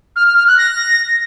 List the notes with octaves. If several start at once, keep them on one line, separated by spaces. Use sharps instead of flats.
F6
F6
F6
F#6
A#6